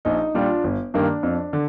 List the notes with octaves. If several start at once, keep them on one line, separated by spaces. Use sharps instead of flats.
A#1 D#4
A#2 G3 D4 F4
G1
G2 D#3 A#3 D4
F2
D3